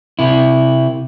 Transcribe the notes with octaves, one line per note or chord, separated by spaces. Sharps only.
C3 E4